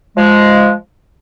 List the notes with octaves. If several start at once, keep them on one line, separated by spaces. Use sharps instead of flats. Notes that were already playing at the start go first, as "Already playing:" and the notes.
F3 G#3